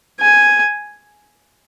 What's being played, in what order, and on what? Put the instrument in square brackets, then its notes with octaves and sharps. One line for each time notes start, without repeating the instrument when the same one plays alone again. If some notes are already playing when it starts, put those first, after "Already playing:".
[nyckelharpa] G#5